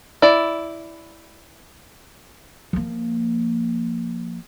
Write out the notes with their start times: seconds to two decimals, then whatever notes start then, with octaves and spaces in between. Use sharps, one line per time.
0.22 E4 D5
2.73 F3 A#3